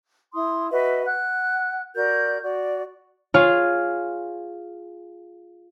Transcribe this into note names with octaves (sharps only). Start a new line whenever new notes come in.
E4 C6 D#6
F#4 B4 D#5 E5
F#5 F#6
F#4 A#4 D5 G6
F#4 D5
F4 G#4 C#5 F6